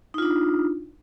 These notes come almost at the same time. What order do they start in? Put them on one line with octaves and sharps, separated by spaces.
D#4 F4 D4